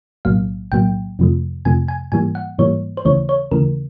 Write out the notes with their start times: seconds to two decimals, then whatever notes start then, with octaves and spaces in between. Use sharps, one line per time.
0.25 B1 A2 F#3 A#3 F5
0.72 B1 A2 F#3 A#3 G5
1.19 F2 C3 F3 A3
1.65 F2 C3 F3 A3 G#5
1.88 G#5
2.12 G#2 E3 G3 A#3 G#5
2.35 F#5
2.58 G#2 E3 G3 A#3 C#5
2.97 C5
3.05 D#2 C#3 E3 A3 C#5
3.29 C#5
3.51 D#2 C#3 E3 A3 A#4